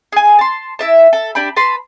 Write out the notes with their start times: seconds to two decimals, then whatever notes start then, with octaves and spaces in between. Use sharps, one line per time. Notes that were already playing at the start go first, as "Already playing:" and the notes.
0.12 G#4 G#5
0.39 A5 C6
0.79 E4 E5 A5
1.13 A4
1.35 D4 G4 B5
1.56 B4 A5 B5 C6